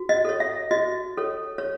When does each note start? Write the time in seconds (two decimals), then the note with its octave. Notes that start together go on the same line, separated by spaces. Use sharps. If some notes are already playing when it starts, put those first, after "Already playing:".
Already playing: F#4
0.09 D#5
0.25 A4 C#5
0.40 E5
0.71 F#4 D#5
1.17 A4 C#5
1.58 C#5